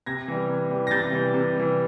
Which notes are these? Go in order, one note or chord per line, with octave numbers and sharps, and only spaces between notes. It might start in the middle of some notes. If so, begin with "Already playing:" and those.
C3 G#6 A#6
E3 G3
C3
E3 G3
A#6
C3 G6 A6
E3 G3
C3
E3 G3